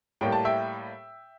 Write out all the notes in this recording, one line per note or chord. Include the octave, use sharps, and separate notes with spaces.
A2 G3 A#3 G5
A5
E5 G5